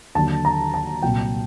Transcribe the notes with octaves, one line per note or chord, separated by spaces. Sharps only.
D#2 D3 F#3 A5
A#5
A5
C2 A#2 F#3 G5